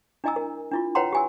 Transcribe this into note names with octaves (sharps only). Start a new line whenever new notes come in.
D4 E4 D#5 G#5 A#5 E6
A#4
D4 E4 F4
B4 C#5 F#5 G5 A#5 C6
G4 G#5 E6